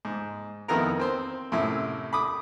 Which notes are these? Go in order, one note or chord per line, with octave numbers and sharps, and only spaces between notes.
G#2
F2 D#3 B3 E4 A#4 A#5
C4 C5
F#2 A2 C3 E4
B5 D6 D#6